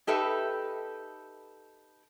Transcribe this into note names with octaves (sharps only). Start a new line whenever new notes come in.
D#4 G4 A4 B4 E5